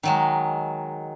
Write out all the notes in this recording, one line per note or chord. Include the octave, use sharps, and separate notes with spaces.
D#3 F#3 G#3